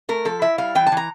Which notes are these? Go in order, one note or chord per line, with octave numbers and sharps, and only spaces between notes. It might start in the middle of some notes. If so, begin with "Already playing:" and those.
A3 A#4
F3 A4
E4 E5
G3 F5
E3 G5
A5
E3 A#5